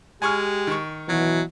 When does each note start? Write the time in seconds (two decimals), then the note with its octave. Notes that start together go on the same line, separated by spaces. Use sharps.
0.22 G#3 G4 G#5 C#6 F6
0.67 D#3 C#6
1.09 B2 E3 F#3